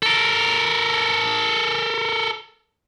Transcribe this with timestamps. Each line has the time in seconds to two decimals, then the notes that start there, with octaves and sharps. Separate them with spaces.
0.03 A4 A#4